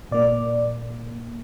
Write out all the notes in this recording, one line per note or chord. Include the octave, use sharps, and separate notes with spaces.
A#2 A#3 D5